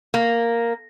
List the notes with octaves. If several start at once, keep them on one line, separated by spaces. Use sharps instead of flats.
A#3